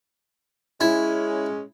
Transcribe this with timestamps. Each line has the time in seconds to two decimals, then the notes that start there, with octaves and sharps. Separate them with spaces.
0.81 G#3 C#4 E4